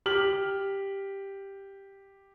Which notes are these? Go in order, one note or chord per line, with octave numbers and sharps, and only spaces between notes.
G4 F6 F#7